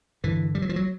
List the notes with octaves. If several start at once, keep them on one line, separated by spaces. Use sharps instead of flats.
G2 D3 E3
G3
F#3
F3
F#3